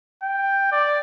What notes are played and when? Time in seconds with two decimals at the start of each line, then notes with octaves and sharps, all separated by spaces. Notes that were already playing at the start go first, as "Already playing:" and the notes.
0.23 G5
0.72 D5